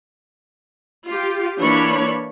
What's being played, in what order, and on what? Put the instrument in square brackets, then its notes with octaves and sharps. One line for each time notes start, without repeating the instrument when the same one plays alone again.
[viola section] F4 G4
E3 A#3 D4 C#5 B5